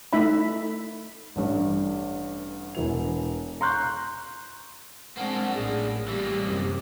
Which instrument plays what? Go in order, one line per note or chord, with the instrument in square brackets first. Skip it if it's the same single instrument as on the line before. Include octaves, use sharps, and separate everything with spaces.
[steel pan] A3 D#4 E4 E5 B5
[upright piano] A1 G2
E1 E3 F7
A#5 C6 C#6 F#6 G6
[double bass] G#3 C4 [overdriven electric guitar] A#3 D4 [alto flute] F#5
[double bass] A1 A2 [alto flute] G#4
[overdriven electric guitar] E3 A#3 [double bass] G3 [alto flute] G4
[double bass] F#2 C3